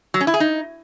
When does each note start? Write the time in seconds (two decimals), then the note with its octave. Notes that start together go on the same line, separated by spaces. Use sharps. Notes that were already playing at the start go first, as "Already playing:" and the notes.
0.14 F#3
0.21 C#4
0.27 E4
0.34 G#4
0.40 D#4